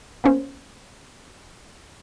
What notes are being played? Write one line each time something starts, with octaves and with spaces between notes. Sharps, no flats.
A#3 B3 C#4 C5